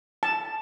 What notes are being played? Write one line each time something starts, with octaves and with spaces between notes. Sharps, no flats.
A5